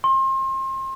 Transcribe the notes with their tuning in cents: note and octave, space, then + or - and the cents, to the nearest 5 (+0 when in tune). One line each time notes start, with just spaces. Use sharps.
C6 +35